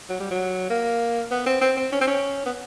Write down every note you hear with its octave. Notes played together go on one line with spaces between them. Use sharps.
F#3
G3
F#3
A#3
B3
C4
C4
C4
C#4
C4
C#4
B3